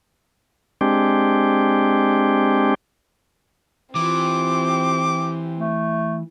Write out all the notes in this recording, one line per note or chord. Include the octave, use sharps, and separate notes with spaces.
G#3 C4 D4 G4
E3 C4 F4 G4 D6
A3